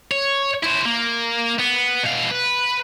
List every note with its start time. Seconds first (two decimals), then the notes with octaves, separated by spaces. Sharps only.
0.11 C#5
0.63 E4 C5
0.85 A#3
1.59 B3
2.03 B2 F5
2.31 B4